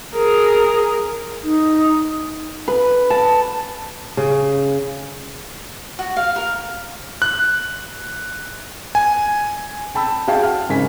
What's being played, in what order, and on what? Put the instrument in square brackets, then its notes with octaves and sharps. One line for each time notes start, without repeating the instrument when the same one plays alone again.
[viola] G#4 A#4
[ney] D#4
[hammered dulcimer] B4
A5
[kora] C#3
[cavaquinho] F#4
F5
A#4
[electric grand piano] F#6
G#5
[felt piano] G5 A5 B5 E6
F#4 G#4 F5 G5 A5
F6
G#1 C#3 G#5 B6